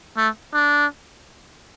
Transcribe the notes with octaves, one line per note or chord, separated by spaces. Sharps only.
A3
D4